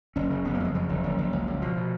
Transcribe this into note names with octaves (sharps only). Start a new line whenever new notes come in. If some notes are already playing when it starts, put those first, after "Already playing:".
F#1 C#4
C#3
F#1 B3
A#3
F2 G#3
C#3 F3
F#1
F#1
F#1
C#2
C#2
B2 F3
B2